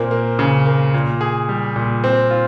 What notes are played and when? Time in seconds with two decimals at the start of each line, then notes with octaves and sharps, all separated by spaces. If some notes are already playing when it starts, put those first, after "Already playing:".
Already playing: A#2 A#3 C4
0.11 A#3
0.39 C#3
0.66 A#3
0.94 A#2
1.21 G#4
1.49 G3
1.76 A#2
2.04 C4
2.31 F4